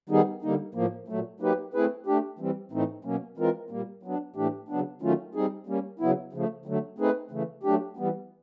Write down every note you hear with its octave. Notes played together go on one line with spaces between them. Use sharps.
D#3 G3 B3 D#4 G#4
D3 G3 A#3 D#4
A2 F3 A#3
A#2 F#3 A3
F#3 A#3 D#4 G4 B4
A3 C4 E4 G#4 B4
A3 D4 G4
E3 G3 C4
A2 E3 A3 C4 D#4
B2 F#3 A#3 C#4
E3 G#3 C4 F4 A#4
A#2 G3 A#3
F#3 B3 D4
A2 E3 A3 D4 G4
C#3 F#3 B3 D4
D#3 F#3 A3 C#4 F4
G3 C4 D#4 G#4
G3 A#3 C#4
C#3 F#3 B3 E4
C#3 F3 A3
D3 F#3 A3
A3 C4 D#4 G#4 B4
C#3 E3 A3
F#3 A3 D4 G4
E3 G3 B3